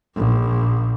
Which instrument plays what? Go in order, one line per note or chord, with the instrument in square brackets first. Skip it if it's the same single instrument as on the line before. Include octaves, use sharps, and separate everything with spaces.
[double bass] A#1